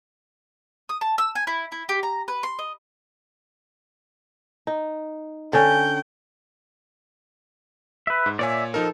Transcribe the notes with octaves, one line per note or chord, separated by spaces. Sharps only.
D#6
A5
E6
G#5
E4
E4
G4
A#5
B4
C6
D#5
D#4
D3 C#4 G5
B4 E5
G#2
A#2 C#5 D5 E5 G#5
F3 D#4 A4 A#4